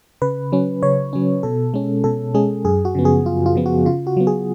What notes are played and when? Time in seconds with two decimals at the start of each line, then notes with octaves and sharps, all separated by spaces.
0.22 C#3 B4
0.52 F#3 C#4
0.83 C#3 C#5
1.13 F#3 C#4
1.43 B2 A4
1.74 G#3 C#4
2.04 B2 A4
2.35 G#3 C#4 G#4
2.65 F#2 G#4
2.85 F#4
2.95 C#3 F3 B3
3.05 G#4
3.25 F#2 F4
3.46 F4
3.55 C#3 F3 B3
3.66 F#4
3.86 C#3 F4
4.07 F#4
4.17 F#3 B3
4.27 G#4